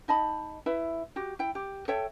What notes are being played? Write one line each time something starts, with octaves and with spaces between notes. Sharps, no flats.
D#4 D#5 A5 B5
E4 B4 E5
F#4 G4
E4 G5
G4
A4 C#5 E5 G5